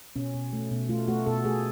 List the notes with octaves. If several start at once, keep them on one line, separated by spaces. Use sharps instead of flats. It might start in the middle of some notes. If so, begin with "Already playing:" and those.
B2 C#4
B2
A3
B2
A3 F4
A3 F#4
B2 A4
A3 G#4